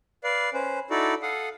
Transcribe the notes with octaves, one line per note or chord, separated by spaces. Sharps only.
B4 D5 F5
C#4 B4 C5
D#4 E4 F#4 A4 D5
A4 F5 F#5 D#6